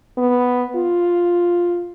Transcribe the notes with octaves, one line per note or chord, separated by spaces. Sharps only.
B3
F4